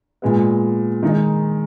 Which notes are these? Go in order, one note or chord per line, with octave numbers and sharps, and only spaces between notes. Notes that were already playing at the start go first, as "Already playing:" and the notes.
A#2 G#3 B3
D#3 G#3 D#4